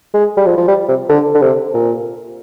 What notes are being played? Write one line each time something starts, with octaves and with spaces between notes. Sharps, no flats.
G#3
G3
F3
F3
G3
C3
D3
D3
C3
A#2